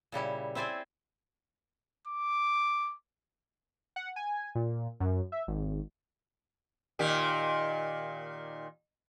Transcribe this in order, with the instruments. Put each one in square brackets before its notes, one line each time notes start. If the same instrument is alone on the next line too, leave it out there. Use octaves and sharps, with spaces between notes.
[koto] A#2 C#3 G3 E4
C4 E4 C5 D5 G#5
[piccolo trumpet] D6
[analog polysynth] F#5
G#5
A#2
F#2
E5
G#1
[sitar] A#2 D#3 G4